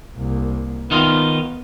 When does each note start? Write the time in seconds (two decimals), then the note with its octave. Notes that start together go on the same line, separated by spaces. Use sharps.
0.17 C2 A#3
0.91 D#3 B3 D#4 F4